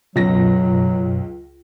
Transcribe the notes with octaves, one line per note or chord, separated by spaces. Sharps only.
C#2 F#2 B2 F#3 A#6